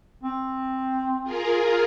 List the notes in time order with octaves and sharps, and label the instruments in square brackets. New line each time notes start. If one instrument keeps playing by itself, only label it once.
[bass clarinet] C4
[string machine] F4 G#4 A#4